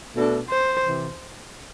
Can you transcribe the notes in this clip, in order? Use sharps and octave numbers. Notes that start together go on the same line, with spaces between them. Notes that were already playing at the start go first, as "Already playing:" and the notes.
B2 A3 D4 A4
C5
C3 E3